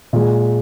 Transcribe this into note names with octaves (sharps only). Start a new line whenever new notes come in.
A#2 G#3